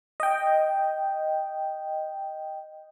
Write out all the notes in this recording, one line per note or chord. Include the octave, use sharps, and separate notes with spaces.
D#5 G5